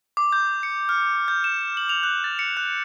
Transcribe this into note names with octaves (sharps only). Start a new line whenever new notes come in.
D6
G6
C#7
F6
G6
E7
F#7
F7
F#6
A6
C#7
F#6